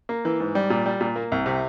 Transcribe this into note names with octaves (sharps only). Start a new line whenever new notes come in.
A#3
E3
G#2
G3
A#2
G3
A#2
A#3
C2
C3